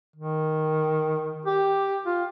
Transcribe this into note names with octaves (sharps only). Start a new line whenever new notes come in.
D#3
G4
F4